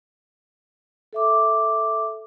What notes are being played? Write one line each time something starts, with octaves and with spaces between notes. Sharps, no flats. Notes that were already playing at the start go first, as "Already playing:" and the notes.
A4 E5 D6